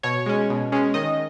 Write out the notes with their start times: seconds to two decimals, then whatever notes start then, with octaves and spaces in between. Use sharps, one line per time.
0.03 B2 C#5
0.26 G#3 C#4
0.50 B2
0.72 G#3 C#4
0.94 D#3 D#5